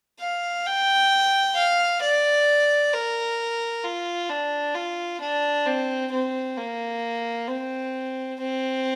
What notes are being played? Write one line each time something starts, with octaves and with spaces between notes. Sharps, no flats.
F5
G5
F5
D5
A#4
F4
D4
F4
D4
C4
C4
A#3
C4
C4